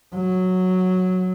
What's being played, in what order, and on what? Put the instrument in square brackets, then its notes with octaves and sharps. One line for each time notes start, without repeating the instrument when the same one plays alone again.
[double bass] F#3